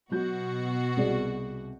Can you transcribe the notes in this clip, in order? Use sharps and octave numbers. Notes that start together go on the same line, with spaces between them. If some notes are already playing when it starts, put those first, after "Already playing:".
B2 F#3 F#4 G6
C2 G#4 D5